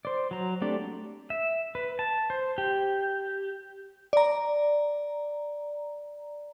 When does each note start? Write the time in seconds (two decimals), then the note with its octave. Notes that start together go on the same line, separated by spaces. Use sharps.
0.05 C5 D5
0.31 F#3 A#5
0.61 A3 C4 D4 G4 D5
1.30 E5
1.75 B4
1.99 A5
2.30 C5
2.58 G4
4.13 D5 A#5